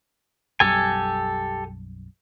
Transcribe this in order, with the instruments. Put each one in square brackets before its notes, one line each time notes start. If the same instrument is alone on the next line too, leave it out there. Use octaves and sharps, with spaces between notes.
[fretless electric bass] B1 F#2 G3 [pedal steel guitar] G4 A4 G#5